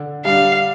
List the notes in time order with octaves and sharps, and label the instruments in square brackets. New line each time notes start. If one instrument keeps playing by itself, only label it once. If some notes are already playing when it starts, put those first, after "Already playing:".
Already playing: [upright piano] D3
[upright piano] G3 D4 [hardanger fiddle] F5